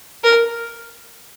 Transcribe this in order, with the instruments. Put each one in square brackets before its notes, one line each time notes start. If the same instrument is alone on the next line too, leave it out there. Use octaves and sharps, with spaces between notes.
[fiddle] A#4